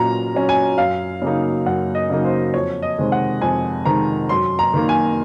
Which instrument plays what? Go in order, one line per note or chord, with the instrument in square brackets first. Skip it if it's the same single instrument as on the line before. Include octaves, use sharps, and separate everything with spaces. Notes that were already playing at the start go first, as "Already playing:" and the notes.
Already playing: [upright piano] A#2 F#3 C#4 A#5
F#3 C#4
G#5
F#2 F5
C#3 F#3 A#3 D#4
F#2 F#5
D#5
C#3 F#3 A#3 D#4
C5
F2 C#5
D#5
C3 D#3 G#3 C4
F#5
F2 G#5
C3 D#3 G#3 C4 A#5
F#2 C6
A#5
D#3 A#3
G#5